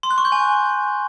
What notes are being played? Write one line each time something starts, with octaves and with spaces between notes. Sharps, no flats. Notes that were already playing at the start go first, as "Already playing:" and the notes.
C6
F#6
C#6
G6
G#5